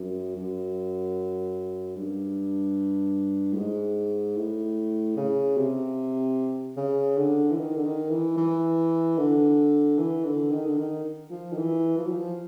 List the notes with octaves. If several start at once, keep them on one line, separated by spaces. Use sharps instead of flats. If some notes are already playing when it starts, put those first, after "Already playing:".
Already playing: F#2
F#2
G2
A2
G#2
A2
C#3
C3
C#3
D3
E3
D#3
D3
D#3
E3
E3
D3
E3
D3
D#3
D3
D#3
F3
D#3
E3
F3
F#3
F3